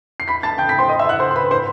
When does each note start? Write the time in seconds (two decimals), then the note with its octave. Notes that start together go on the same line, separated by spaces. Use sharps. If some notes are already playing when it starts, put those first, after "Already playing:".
0.20 C7
0.28 B5 B6
0.43 A5 A6
0.58 G5 G6
0.69 B5 B6
0.79 C5 C6
0.89 D#5 D#6
0.99 E5 E6
1.09 F#5 F#6
1.20 C5 C6
1.31 C6
1.35 B4 B5
1.51 C5 C6